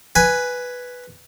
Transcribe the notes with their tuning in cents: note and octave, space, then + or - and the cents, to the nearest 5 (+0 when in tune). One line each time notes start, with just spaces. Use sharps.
B4 +0 G#5 +0